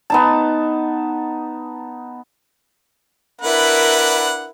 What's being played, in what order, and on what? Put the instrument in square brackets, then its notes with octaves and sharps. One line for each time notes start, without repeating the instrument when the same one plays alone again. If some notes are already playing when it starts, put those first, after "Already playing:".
[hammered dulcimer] B3 D#4 A5
[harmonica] D4 B4 F#5 [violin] E4 A#4